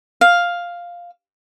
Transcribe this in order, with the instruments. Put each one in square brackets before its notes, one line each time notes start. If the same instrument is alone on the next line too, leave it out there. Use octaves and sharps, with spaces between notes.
[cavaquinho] F5